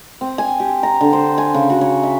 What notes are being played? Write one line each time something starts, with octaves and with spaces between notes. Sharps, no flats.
C4
G#5
G4
A#5
D3
C5
G#5
C#3
F#4
C#5
E5